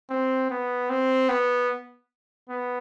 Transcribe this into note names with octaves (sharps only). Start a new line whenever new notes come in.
C4
B3
C4
B3
B3